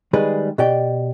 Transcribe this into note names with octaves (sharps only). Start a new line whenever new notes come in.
D#3 G3 G#3 G#4 B4
B2 G4 D5 G5